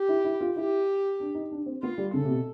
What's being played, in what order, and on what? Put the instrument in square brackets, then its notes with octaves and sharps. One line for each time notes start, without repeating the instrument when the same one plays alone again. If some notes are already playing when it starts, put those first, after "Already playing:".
Already playing: [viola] G4
[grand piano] E4
E4
F4
[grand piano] E4 [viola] G4
[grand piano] D4
D#4
D4
C4
[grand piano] B3 [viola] F4
[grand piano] G3
[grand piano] C#3 [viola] A4
[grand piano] C3
B2